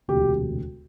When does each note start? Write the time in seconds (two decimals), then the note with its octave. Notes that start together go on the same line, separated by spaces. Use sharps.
0.08 E1 D2 C3 G4